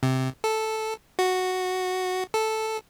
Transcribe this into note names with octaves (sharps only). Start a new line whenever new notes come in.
C3
A4
F#4
A4